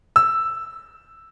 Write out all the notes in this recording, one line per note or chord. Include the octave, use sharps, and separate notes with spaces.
E6